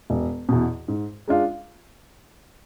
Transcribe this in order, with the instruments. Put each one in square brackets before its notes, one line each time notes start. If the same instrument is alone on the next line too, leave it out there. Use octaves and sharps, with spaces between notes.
[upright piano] E1
E2 B2
G#2
G#3 D4 F4